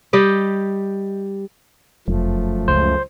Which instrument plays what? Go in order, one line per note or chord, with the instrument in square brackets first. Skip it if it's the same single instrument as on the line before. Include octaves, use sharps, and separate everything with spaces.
[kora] G3 G4 D#5
[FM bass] F1 [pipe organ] F#2 F3 A3
[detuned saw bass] C#2 [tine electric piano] C5